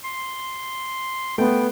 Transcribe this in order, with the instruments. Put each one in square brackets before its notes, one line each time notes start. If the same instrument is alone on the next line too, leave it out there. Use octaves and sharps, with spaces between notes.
[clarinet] C6
[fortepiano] A3 [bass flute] B3 [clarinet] G5